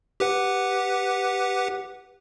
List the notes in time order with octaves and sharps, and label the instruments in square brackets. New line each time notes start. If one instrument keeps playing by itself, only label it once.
[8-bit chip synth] G4 B4 F#5